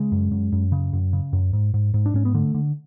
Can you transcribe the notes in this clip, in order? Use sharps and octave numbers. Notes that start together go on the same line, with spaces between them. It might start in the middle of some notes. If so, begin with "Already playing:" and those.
Already playing: C#3 G#3
F#2
F#2
F#2
C#3
F#2
C#3
F#2
G#2
G#2
G#2
D4
G#2 C#4
B3
D3 A3
D3